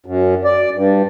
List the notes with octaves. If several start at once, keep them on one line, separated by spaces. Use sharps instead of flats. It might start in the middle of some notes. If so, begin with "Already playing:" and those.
F#2
D5
G2